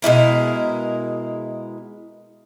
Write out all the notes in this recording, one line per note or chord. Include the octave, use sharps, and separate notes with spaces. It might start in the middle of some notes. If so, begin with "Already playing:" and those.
B2 G#3 E4 A#4